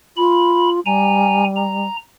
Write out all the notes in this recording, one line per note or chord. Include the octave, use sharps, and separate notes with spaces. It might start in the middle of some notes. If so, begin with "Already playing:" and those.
F4 B5
G3 G#5 A#5
A#5